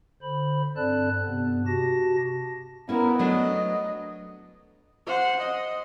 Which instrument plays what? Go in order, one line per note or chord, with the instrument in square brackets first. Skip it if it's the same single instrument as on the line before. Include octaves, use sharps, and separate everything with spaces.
[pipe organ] D3 C5 B5
G2 C4 A4 D5 A5 F#6
G2 C3 B3
C3 F#4 G4 A5 A#6
[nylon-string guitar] A#3 C#4 [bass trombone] B3 [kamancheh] E4 A#4
[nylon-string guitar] F#3 A3 D4 [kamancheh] D#5
[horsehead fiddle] C5 F#5
D#5